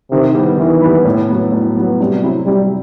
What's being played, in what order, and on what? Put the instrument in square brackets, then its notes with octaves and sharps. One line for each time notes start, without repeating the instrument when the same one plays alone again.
[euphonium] C3 [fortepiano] D#3
[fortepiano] G3 B3 E4
[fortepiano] D#3 [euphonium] E3
[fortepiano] G3 B3 E4
A2
F#3 B3
A2
F#3 B3
[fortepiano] C3 [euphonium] G3
[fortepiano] F#3 C4 E4
[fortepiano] C3 [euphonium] G3